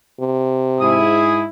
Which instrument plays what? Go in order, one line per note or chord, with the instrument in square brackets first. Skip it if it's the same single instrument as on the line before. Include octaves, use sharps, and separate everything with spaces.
[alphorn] C3
[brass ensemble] G#2 E4 [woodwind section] G#4 D#6